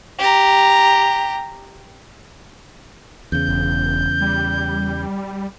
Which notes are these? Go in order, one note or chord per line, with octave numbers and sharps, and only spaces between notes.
G4 A#5
E2 C#3 G6
E1
G3